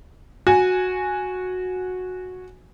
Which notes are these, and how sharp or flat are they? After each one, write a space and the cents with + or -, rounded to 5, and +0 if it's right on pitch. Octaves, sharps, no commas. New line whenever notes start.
F#4 -10 G#5 +0